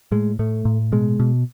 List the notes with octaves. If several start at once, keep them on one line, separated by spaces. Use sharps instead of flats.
A2 G#3
A2 A3
A2
B2 G#3
B2